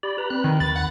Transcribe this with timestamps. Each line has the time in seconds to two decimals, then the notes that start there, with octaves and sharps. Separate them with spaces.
0.03 G4 D5 B5
0.18 B4 A#5 B5
0.30 C4 B5 F#6
0.44 D#3
0.60 D#2 B5 A6
0.76 F#5